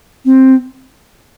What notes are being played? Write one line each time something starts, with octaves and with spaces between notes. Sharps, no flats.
C4